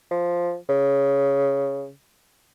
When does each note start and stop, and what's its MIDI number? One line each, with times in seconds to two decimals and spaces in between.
0.11 0.56 53
0.69 1.91 49